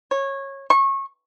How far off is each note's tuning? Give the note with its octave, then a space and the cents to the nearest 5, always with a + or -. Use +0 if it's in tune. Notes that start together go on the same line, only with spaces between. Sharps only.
C#5 -20
C#6 -25